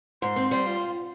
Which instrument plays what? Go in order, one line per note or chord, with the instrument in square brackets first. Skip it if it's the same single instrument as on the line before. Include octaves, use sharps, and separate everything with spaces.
[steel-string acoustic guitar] G#2 [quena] C6
[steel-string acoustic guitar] C4
[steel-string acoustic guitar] G3 [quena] C6
[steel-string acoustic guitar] F4